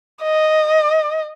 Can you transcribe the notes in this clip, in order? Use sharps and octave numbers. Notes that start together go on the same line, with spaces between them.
D#5